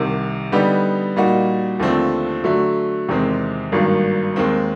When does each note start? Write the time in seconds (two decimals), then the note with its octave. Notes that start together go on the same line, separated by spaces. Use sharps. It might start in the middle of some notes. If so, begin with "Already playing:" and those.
Already playing: C2 C3 D#3
0.52 D3 G3 B3 D#4 G4
1.16 A#2 G3 A#3 D#4 F#4
1.80 D#2 D3 F3 A3 C4
2.44 D3 F#3 A3
3.09 E2 C3 D#3 G#3 C4
3.72 G#1 G2 D#3 F#3 A#3
4.36 D#2 D#3 G#3 C4